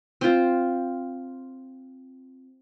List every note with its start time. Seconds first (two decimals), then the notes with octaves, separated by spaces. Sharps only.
0.21 C4 F4